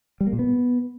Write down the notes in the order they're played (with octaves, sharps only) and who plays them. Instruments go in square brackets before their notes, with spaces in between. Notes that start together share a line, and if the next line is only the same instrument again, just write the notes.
[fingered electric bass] G3
A#3
A#2
B3